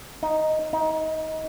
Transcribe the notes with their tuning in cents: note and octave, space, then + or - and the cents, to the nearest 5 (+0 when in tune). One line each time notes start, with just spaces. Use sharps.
D#4 +0
D#4 +20